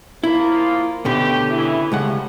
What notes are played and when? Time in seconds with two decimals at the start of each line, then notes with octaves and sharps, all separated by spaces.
0.24 F3 A#3 E4 F4
1.05 B2 D3 A3 C#4 G4
1.50 C#3 E3 E4
1.92 C#2 A2 G3 G#3 F#5